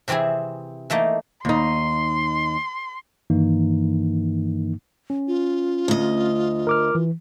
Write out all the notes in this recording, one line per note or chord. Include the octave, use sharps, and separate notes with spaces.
C3 E3 C4 E4 G#4
E3 A3 A#3 D#4
D#2 D#4 C6
G2 D#3 E3 A#3 D#4
C#4
F4
D2 D#5
A#4 D6 F6
E3